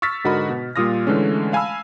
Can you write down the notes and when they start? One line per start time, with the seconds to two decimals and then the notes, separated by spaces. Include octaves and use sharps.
0.02 C#6 E6 F6 A6 B6
0.24 G#2 D3 F#4 A#4 D#5 B5
0.49 B2
0.76 A#2 G3 F4 D#6 F6 A#6
1.07 D3 E3 G#3 A3 C#4
1.53 F5 G#5 A5 B5 E6